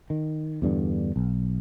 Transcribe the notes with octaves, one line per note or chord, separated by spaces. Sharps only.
D#3
E2 G2 D3
B1